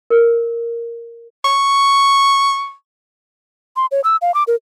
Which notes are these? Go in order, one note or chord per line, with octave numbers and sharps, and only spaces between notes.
A#4
C#6
C6
C#5
E6
F5
D6
A#4